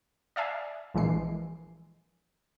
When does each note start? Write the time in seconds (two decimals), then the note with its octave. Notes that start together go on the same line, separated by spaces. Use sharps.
0.36 D5 E5 F5 G#5
0.94 A#1 E3 G#3 C7